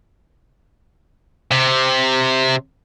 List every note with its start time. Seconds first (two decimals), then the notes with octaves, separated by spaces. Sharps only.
1.51 C3